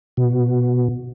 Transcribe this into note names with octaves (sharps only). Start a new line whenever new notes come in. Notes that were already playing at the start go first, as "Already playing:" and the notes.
B2